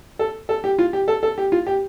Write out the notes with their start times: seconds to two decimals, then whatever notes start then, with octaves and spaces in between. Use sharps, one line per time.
0.19 A4
0.49 A4
0.64 G4
0.78 F4
0.93 G4
1.08 A4
1.23 A4
1.38 G4
1.52 F4
1.67 G4